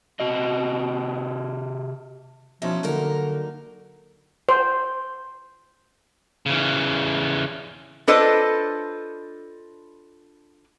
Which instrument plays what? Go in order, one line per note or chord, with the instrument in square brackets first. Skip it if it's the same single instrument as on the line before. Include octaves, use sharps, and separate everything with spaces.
[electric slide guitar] C3 F#4 D#5
[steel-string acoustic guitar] B2 D#4 E4 [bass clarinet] F3 [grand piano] C#4 E5
[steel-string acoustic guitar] G2 D#4 A#4 [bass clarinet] D3 [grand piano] F#3 A#3
[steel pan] C5
[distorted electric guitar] C#3 E3
[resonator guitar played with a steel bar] D4 F4 A4 B4 C5 D#5